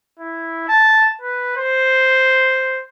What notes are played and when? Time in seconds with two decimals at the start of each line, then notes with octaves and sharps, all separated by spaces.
0.20 E4
0.69 A5
1.21 B4
1.57 C5